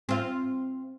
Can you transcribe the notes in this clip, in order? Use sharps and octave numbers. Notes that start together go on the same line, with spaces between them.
C4 F4